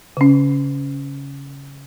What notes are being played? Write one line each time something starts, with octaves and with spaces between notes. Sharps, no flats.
C#3 C#4